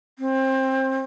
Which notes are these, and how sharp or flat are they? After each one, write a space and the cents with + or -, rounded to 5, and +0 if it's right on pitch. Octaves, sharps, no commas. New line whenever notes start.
C4 +25